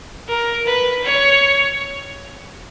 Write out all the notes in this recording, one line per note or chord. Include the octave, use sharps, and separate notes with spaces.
A#4
B4
C#5